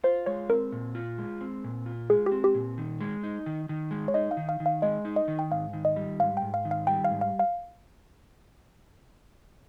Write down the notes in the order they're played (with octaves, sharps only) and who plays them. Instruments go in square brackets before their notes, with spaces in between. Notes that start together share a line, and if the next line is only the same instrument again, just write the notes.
[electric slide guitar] F4 [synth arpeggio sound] C5
[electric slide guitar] G#3 [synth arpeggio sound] C#5
[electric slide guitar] C4 [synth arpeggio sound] A#4
[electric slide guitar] A#2
F4
G#3
C4
A#2
F4
[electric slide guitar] G#3 [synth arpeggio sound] G#4
[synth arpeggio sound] G4
[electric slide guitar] C4
[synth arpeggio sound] G4
[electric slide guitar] A#2
D#3
G#3
D#4
D#3
D#3
G#3
[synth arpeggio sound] C#5
[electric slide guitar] D#4 [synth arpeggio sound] D#5
[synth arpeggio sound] F5
[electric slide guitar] D#3
[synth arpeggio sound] F5
[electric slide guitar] D#3
[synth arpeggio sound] F5
[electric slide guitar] G#3 [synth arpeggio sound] D#5
[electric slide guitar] D#4
[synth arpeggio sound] D#5
[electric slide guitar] D#3
[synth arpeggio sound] G5
[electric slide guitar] G#2 [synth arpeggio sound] F5
[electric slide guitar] D#3
[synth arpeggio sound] D#5
[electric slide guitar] G3
[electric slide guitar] G#2 [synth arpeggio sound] F5
[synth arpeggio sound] G5
[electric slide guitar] G#2
[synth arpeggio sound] F5
[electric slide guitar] D#3
[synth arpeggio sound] F5
[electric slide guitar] G3 [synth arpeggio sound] G5
[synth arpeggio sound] F5
[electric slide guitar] G#2
[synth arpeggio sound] F5
F5